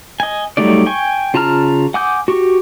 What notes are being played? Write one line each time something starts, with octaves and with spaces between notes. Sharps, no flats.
D#5 G#5
F#3 G3 A3 D#4 D5
G5 G#5 C#6
C#3 F4 A5 A#5 F6
F#5 G#5 D6 D#6 G6
F#4 G4 C#6